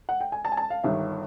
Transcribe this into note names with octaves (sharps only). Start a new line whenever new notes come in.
F#5
G5
G#5
A5
G#5
A5
F5
G1 G2 D#3 E5